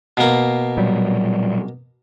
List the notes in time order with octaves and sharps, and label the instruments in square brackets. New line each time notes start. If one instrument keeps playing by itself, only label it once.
[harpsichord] B2 A#3
[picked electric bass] A#2 F#3 G3